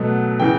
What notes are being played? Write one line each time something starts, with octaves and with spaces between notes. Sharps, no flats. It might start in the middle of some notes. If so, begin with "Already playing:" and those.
Already playing: B2 F#3 A3
C#3 E3 G5